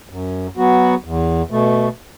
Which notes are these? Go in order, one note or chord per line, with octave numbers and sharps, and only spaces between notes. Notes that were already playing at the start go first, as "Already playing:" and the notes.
F#2
F#3 B3 F#4
E2
B2 A3